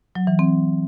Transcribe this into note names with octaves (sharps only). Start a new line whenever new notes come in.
F#3
E3
C4